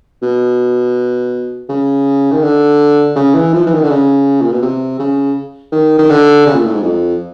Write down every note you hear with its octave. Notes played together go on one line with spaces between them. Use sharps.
B2
C#3
D#3
D3
C#3
E3
F3
E3
D#3
D3
C#3
A#2
B2
C3
C#3
D#3
D#3
D3
C#3
A#2
A2
G#2
F2